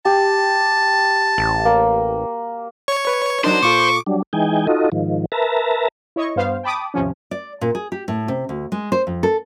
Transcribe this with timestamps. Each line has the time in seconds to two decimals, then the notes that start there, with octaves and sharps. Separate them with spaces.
0.05 G4 A5
1.38 A1
1.65 A#3
2.88 C#5 C#6
3.07 B4
3.44 F#3 D4 D#4 A#4 C5
3.63 A#2 F4 A4 C#6 D6
4.06 F#3 G3 D4
4.33 E3 G#3 D#4 G5 G#5
4.67 D#4 F4 F#4 A4 D#5
4.92 G#2 D#3 F3
5.32 A#4 B4 E5 A5 A#5
6.16 E4 C#5 D#5 C#6
6.36 G2 B3 C5 F5
6.63 G5 A5 B5 D6 D#6
6.94 D#2 G#2 C3 F3 C#4
7.31 D5
7.61 A#2
7.75 G#4
7.92 G4
8.08 A2
8.28 C3
8.49 D2
8.72 G#3
8.92 C5
9.07 F2
9.23 A4